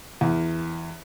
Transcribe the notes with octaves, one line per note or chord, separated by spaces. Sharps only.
E2